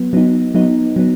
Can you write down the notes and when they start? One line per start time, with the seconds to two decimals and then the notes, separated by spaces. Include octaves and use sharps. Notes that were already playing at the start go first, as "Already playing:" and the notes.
Already playing: F#3 B3
0.13 F#3 B3 D#4
0.54 F#3 B3 D#4
0.96 F#3 B3